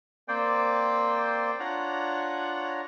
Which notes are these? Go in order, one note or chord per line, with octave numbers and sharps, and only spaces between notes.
A#3 C4 C5 D5 G5
D4 F4 C#5 F#5 A#5